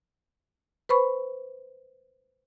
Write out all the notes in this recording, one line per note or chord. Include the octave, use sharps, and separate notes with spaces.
B4 C5 B5 C#6